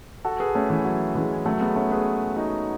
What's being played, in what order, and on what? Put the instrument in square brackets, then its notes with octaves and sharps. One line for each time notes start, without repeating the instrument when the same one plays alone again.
[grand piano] F#4 A4
G#4 B4
A3 C#4
E3
F#3
E3 G#3
F#3 A3
G#3 B3
A3 C#4
G#4 B4
D#4 F#4